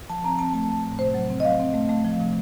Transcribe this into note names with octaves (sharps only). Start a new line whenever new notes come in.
F3 A5
C4 A#5
C4 A5
A3 A5
A3
A2
C3 C5
F#3
C4
D#5
F#3 F5
C4
A3
A3
F3
C3